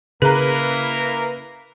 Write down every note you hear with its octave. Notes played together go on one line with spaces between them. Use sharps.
C#3 A#3 E4 G#4 A#4 B4 A#5